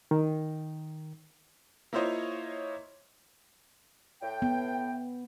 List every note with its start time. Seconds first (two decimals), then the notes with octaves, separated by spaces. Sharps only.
0.11 D#3
1.93 A#3 E4 F4 C5 C#5 D#5
4.22 A2 G5
4.42 B3